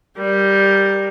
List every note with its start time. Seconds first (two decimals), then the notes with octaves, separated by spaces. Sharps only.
0.18 G3 A#4